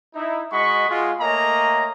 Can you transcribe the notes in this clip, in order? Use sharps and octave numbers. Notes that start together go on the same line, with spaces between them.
D#4 E4
G#3 F#4 D#5 B5 C#6
G#3 F4 F#4
A3 A#3 C#5 D#5 G#5 A#5